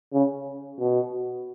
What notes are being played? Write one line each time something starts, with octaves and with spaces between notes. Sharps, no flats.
C#3
B2